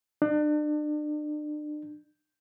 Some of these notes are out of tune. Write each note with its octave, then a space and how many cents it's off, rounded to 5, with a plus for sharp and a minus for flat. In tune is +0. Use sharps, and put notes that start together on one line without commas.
D4 +35